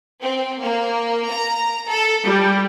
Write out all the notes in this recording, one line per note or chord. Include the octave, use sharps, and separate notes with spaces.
C4
A#3
A#5
A4
G3